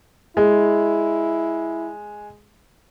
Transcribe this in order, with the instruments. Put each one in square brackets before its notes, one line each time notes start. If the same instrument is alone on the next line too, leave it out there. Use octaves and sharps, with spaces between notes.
[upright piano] G#3 [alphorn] E4